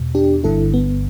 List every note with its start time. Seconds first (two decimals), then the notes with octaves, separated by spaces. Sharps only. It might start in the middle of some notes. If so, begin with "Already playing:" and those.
Already playing: E2 B2
0.15 D4 G4
0.44 G1 G2 D3 E4 A4
0.74 B3